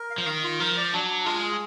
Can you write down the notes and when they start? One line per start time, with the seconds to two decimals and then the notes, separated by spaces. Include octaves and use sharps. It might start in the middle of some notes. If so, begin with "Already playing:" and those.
Already playing: A#4
0.11 F5
0.18 F3
0.26 D#3 F5
0.43 F4
0.60 F3 A#4
0.77 D5
0.93 F#3 D4
1.09 D4
1.25 G#3 F4
1.42 G#4